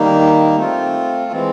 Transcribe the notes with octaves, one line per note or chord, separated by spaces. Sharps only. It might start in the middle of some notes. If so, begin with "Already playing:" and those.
Already playing: D#3 G3 A#3 D#4
A3 C4 F4
E3 G#3 C4